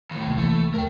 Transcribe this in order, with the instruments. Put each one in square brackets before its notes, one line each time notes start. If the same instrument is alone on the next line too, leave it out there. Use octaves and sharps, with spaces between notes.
[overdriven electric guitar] D#2 A2
[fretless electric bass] C2 C3 A#3
[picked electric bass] E3 [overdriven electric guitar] A3
[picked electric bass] D#2 C#3 A3 [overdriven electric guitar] A#4 G5